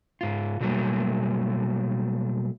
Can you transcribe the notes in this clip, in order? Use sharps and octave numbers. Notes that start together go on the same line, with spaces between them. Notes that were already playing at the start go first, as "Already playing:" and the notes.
G#2 F4
B2 D3 F#3 G3 A3 A#3